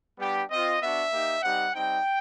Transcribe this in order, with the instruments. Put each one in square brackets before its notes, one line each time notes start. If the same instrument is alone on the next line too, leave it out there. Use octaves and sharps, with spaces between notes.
[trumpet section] G3 B3 D4 G4
C4 F4 D#5
B3 D4 F#4 E5
A#3 D#4 G4
G3 C4 D#4 G4 F#5
G3 C4 D#4 G5